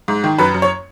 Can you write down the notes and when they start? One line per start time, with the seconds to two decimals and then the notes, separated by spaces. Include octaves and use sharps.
0.08 G#2
0.24 D#3
0.38 F#2 B4
0.54 F#2
0.62 C#5